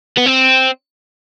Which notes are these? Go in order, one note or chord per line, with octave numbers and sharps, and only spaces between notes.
B3
C4